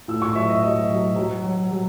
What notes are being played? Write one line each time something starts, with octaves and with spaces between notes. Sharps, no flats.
A2 E6
C#6
F#3 E5
D#5
F#3 D#5
F#3
F#3
F#3
F#3